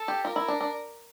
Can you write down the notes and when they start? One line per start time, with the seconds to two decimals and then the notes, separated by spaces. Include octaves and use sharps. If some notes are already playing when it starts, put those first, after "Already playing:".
Already playing: A4
0.08 G4
0.24 F4 A#4
0.36 E4
0.48 D4
0.61 D4